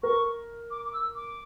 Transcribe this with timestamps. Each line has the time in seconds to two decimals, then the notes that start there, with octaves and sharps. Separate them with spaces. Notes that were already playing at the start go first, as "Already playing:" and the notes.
0.03 A#4 C#6
0.71 D6
0.85 D6
0.93 E6
1.15 D6